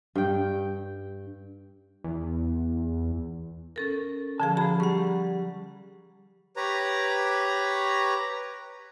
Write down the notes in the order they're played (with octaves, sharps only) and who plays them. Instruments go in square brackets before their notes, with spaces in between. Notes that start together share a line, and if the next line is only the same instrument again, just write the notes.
[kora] G2 G5
[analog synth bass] E2
[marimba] C#4 A4 A#4
[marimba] D3 F3 G#4 [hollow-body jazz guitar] F5 A5
[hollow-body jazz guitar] F#4 G#4 [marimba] A#5 B5
[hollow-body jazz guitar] G3 [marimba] F#5 C#6
[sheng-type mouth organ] G4 B4 C#5 A#5